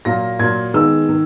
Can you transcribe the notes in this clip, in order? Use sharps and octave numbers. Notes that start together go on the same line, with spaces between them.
A#2 F#3 A#3 A#6
A#2 F#3 A#3 G#6
D#3 G#3 B3 E6
D#3